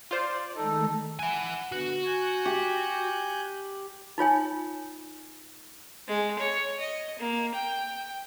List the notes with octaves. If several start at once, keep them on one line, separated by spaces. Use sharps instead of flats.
F4 C5 D5
D#3 G#3 A3 D#4 A4
E5 F#5 G#5
D3 B3 F#4
G#5 F#6 G6
G4
D#4 F4 C#5 G#5
G#3
C#5
D#5
A#3
G5